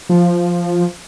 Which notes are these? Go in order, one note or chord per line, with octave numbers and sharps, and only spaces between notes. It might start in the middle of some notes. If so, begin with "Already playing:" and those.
F3